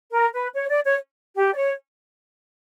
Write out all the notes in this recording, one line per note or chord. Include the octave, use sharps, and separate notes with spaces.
A#4
B4
C#5
D5
C#5
G4
D5
C#5